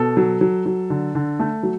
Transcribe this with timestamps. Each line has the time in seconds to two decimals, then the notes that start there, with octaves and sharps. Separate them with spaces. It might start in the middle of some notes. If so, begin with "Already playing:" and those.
Already playing: B2 A4
0.17 F#3
0.41 F#3
0.66 F#3
0.90 D3
1.15 D3
1.40 A3
1.63 F#3